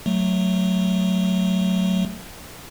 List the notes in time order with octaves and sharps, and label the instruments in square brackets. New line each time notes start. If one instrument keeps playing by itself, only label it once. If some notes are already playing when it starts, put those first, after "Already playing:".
[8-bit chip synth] F#3 A3